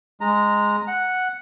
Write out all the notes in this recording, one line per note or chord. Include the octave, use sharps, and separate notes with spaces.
G#3 A#5
F#5